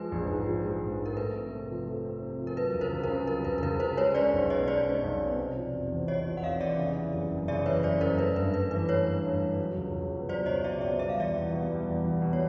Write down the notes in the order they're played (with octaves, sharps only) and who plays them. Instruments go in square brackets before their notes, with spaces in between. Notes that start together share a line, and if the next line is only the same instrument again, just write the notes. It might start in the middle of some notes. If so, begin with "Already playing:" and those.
Already playing: [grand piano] F3 G#3 [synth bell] B4
[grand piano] A#1
G#2
F3
G#3
A#1
G#2
[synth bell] A#4
[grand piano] A3 [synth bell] B4
[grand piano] C4
C3
F3
A3
C4
C3
F3
[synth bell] A#4
[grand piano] F#3 [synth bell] B4
[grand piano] C#2
[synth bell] A#4 C5
[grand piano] C#2
[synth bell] A#4 C5
[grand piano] C#3
[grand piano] F#3 [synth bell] A#4
[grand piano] C#2 [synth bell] B4
[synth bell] A#4
[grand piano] C#2 [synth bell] B4
[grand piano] C#3 [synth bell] A#4 C5
[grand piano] G#3 [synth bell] B4 C#5
[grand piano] C#4 [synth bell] C5 D5
[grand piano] B1
[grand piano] B2 [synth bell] C#5 D#5
[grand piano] G#3 [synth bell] C5 D5
[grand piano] C#4
B1
B2
C3
F3
F1
E2
[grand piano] C3 [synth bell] C#5 D#5
[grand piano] F3
[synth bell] F#5
[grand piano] F1 [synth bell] D#5 F5
[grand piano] E2 [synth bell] D5 E5
[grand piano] C#3
E3
F#1
F#2
[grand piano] C#3 [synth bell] D5 E5
[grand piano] E3 [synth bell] B4 C#5
[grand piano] F#1 [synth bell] C5 D5
[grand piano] F#2 [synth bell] A#4 C5
[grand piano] A3 [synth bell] B4
[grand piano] G2 [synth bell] B4
[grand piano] G2 [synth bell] B4
[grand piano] E3 [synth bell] B4
[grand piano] A3 [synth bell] B4 C#5
[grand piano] G2
G2
E3
F#3
C#2
C#2
B2
[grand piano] F#3 [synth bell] C5 D5
[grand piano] C#2 [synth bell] C#5 D#5
[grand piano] C#2 [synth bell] D5 E5
[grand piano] B2 [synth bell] D5 E5
[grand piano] G3 [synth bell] E5
[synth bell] F5
[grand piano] E2 [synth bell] D5 E5
[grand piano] E2
B2
G3
E2
E2
B2
[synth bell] C#5